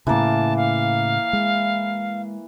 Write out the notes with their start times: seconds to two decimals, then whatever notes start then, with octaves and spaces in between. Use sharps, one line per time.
0.07 A2 C#3 E3 A#3 A5
0.57 F5
1.33 G#3